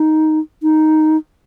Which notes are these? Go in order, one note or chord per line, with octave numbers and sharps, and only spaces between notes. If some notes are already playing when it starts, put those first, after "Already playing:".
Already playing: D#4
D#4